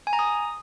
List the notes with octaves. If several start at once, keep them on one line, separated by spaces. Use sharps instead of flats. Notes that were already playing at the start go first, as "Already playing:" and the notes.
G#5
A#5
D#6